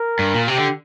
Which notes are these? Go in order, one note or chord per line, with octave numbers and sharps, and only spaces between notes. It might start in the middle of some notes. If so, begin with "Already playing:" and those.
Already playing: A#4
G2
A#2
C3 G4
D3